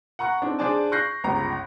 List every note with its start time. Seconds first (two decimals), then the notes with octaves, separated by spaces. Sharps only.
0.19 F#5 A#5 C#6 F#6
0.42 C4 D4 D#4
0.59 D4 G#4 C5 D5 G#5 A5
0.92 C#6 F#6 G6 A#6 C7
1.24 G1 C#2 A#5